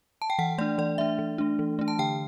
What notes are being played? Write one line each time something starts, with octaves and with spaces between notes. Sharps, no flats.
A5
G5
E3 F#5
A3 D4 D5
E3 D5
A3 D4 E5
E3
A3 D4
E3
A3 D4
A5
D3 G5